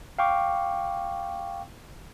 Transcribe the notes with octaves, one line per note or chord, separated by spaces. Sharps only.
F5 G5 C#6 D6